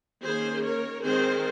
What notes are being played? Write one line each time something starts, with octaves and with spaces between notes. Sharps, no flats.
D#3 A#3 C#4 G#4 C5
A#4 C#5
D#3 G#3 C4 G#4 C5